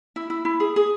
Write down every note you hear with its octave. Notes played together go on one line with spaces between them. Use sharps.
E4
E4
E4
G#4
G#4